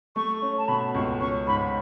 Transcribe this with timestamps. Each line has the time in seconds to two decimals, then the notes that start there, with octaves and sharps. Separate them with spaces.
0.16 A3 C#6
0.42 C#4
0.58 A5
0.68 B2 B5
0.94 C#2 C#6
1.21 C#4 C#6
1.47 G#2 B5